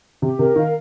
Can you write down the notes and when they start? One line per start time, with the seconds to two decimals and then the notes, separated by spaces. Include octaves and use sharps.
0.22 C3 G4
0.39 C3 A#4
0.56 D#3 F5